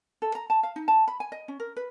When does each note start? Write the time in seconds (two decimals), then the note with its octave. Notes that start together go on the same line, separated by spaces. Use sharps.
0.22 A4
0.35 A#5
0.50 A5
0.63 F5
0.76 D#4
0.88 A5
1.08 B5
1.20 G#5
1.32 D#5
1.48 C#4
1.60 A#4
1.76 B4